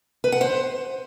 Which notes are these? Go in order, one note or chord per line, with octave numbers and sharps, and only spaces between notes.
B4
F#5
C5